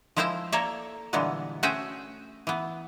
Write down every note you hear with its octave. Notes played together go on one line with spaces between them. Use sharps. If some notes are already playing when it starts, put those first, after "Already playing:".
F3 G#3 E4 C5 G5 A5
A#3 A4 A#4 C#5 D5 E5
A#2 D3 E3 G3 G#3 B3
A3 C#4 F#4 G#4 C5 G5
E3 B3